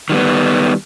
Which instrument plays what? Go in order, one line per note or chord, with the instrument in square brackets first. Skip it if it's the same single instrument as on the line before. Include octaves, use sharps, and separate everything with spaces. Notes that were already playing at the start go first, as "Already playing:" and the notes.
[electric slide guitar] D#3 G3 B3